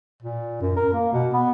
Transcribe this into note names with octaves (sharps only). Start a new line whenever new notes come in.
A#2
F#2
A#4
A#3
B2
B3